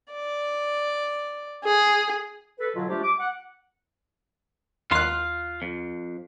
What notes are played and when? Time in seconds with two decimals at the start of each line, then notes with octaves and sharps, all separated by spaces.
0.13 D5
1.64 G#4
2.59 A4 B4
2.75 B2 D3 F#3 F4
2.88 G3 A3 D4 F4 G4 C5
3.02 D6
3.19 F#5
4.91 D#2 F4 F5 C6 F#6
5.62 F2